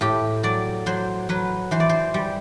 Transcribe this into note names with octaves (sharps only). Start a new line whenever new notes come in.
A2 G4
F#3 D5
F#3 C5
F#3 B4
E3 C5
D5
C5
G3